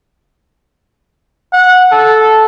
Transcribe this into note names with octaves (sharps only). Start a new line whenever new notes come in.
F#5
A4